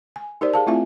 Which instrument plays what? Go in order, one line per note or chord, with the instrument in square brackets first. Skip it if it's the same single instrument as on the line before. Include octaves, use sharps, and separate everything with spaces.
[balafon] G#5
D#4 G4 A#4 C5 D5
G#4 F5 A5
A3 C4 E4 F4 E5 G#5